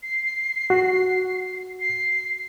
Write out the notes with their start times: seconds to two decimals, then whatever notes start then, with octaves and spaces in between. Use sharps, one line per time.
0.03 C7
0.70 F#4
1.81 C7